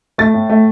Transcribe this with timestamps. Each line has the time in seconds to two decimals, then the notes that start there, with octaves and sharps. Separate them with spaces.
0.18 A3 A6
0.34 A2
0.49 A3